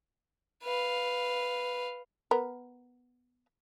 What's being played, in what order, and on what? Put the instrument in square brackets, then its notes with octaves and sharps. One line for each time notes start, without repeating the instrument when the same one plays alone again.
[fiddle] B4 F5
[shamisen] B3 A#4